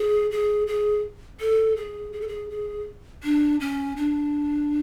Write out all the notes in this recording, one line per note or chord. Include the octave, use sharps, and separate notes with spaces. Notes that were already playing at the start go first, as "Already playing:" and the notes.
Already playing: G#4
G#4
G#4
A4
G#4
G#4
A4
G#4
G#4
D4
C#4
D4